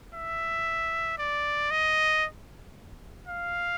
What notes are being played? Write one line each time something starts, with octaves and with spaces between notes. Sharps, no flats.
E5
D5
D#5
F5